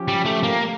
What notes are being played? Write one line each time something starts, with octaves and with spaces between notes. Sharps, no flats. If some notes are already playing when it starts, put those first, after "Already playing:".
Already playing: F3 C#4 G4
G3
A3
A#3